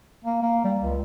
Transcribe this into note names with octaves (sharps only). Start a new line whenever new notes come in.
A#3
A#3
G3
C#2